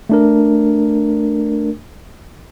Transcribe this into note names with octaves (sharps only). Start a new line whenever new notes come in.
A3 D4 A#4